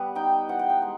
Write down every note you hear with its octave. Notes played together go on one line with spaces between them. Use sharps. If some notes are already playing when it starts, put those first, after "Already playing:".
Already playing: G3 B3
D#4 G5
E3 F#5
G5
F#5
G#3